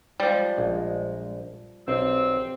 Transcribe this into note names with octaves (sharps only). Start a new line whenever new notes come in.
F3 G3 G#3
A#1
B1 C4 G4 D5 E6